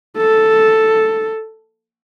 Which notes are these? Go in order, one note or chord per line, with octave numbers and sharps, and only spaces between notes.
A4